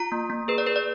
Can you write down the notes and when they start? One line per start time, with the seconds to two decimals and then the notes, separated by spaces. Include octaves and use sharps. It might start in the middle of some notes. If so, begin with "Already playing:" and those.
Already playing: F4 A#5
0.12 A#3
0.30 A#3
0.48 G#4 B4
0.58 D5
0.67 G#4 B4
0.76 D5